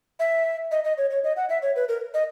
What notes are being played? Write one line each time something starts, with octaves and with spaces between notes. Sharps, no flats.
E5
D#5
D#5
C#5
C#5
D#5
F#5
E5
C#5
B4
A#4
D#5